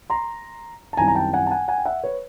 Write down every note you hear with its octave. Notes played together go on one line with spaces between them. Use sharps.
A#5 C6
A5
F#2 D#3 G3 C4 E4 G#5 A#5
A#5
G5 A5
F#5 G#5
A5
F#5 G#5
F#5 G#5
G5
E5 F#5
B4 C#5